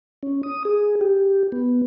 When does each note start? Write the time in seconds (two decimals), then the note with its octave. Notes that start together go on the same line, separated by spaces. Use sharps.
0.23 C#4
0.43 D#6
0.65 G#4
1.01 G4
1.52 B3